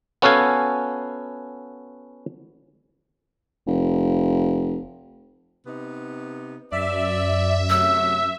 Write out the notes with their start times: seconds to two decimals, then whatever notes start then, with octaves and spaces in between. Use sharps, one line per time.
0.22 B3 C#4 F#4 A4 F5 G#5
3.66 F1
5.66 C3 B3 D#4
6.72 F#2 D5 E5
7.70 C3 F#3 A3 E6